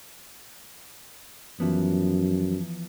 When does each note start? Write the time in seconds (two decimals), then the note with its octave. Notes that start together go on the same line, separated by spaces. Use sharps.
1.60 F#2 E3 F3 B3